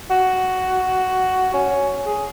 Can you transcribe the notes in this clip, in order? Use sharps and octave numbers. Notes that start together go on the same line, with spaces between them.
F#4
C#4
G#4